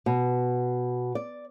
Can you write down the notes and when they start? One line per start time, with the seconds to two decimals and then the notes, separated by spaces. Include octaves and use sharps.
0.06 B2
1.15 D5